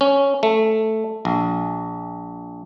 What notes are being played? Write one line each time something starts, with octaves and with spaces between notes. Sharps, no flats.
C#4
A3
A#1